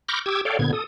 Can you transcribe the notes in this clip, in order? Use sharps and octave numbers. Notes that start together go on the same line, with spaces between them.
B5 C#6 D6 F6 G6 A#6
G4 D6 E6 G#6
A4 C#5 D5 F5 G5
A#2 D3 B3 G#6
A4 D#6